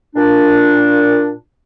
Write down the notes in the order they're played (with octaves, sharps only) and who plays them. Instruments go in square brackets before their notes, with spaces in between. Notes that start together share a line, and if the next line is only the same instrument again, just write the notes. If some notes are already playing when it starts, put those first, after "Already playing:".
[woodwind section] A#2 D4